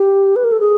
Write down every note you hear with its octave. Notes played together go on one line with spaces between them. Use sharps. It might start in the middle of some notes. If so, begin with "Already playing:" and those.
Already playing: G4
B4
A#4
A4
G#4